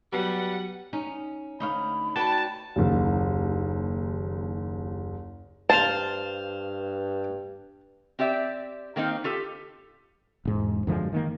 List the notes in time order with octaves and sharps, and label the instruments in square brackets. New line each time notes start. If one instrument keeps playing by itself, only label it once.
[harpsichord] B2 F#3 [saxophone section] G3 B4 [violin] F#5
[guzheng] C#4 [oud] D#4
[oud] D2 C#5 F5 [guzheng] D#4 [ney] B5
[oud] F#4 [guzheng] B4 D5 G5 [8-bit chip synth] A5
[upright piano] F#1 D#2
[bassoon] G2 [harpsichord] C5 F5 [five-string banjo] A5
[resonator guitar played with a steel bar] C4 G4 D5 E5
D#3 A#3 C4 D#4
F4 G4 A4
[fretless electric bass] E1 G#2
F#2 D3 F3 G#3
D#3 A3 A#3